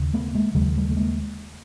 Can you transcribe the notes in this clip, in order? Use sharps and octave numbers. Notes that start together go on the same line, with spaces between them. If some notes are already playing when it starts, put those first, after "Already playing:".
Already playing: D#2 C#3
A3 B3
G#3 A#3
D#2 C#3 F#3 G#3
G3 A3
A3
G#3 A#3